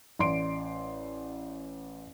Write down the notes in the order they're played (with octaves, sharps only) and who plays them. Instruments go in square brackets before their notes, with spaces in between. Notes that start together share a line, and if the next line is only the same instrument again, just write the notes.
[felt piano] A1 D5 C6 D7